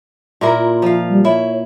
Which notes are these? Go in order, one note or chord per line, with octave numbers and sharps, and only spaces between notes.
A#2 E4 A#4
F4
F3 F5
G3
E4 C#5